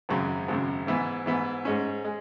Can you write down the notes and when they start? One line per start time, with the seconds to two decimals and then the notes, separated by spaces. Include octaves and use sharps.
0.09 G#1 F#2 C#3
0.48 G#1 F#2 C#3
0.87 G#2 E3 B3
1.26 G#2 E3 B3
1.65 G#2 G#3 C#4
2.05 G#3